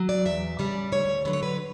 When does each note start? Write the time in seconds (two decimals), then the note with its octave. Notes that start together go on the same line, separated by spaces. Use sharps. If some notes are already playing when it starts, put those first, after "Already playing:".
Already playing: F#3
0.09 D5
0.25 E2 E5
0.59 C#3 G3 D5
0.92 D2 C#5
1.25 D3 F#3 B4
1.33 C#5
1.43 B4